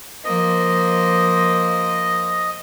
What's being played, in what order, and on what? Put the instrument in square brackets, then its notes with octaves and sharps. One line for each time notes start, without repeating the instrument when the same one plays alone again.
[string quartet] F3 A#3 C5 [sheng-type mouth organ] D#5